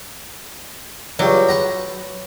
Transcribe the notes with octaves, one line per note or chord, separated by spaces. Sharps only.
C#2 G2 F#3 G4
B4 F#5 A#5